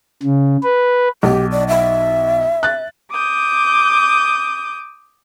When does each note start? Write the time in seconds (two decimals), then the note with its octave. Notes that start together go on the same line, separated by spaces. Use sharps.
0.23 C#3
0.63 B4
1.23 B1 G4
1.51 D5
1.68 E5
2.63 F#6 A6
3.12 D6 D#6 G6